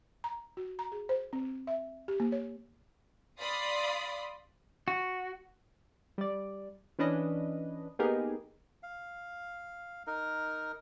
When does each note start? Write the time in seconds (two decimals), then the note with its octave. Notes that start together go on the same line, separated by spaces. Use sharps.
0.24 A#5
0.57 F#4
0.79 A#5
0.92 G#4
1.09 C5
1.33 C4
1.67 E5
2.08 G4
2.20 A#3
2.32 C#5
3.41 D5 F5 B5 C6 D#6
4.88 F#4
6.18 G3 D5
6.99 E3 C#4 D4 B4 D#5
7.99 A#3 B3 D#4 G4 G#4 A#4
8.83 F5
10.07 D#4 A#4